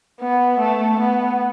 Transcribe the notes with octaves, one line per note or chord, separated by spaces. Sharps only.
B3
A3
B3